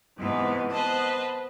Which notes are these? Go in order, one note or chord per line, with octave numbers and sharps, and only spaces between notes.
G#2 C3 E3 B3
B3 B4 C5 D#5 A5